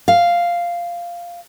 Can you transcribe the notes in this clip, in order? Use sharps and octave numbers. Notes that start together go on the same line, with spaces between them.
F5